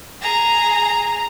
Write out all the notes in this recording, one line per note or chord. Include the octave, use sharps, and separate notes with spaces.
G#4 A#5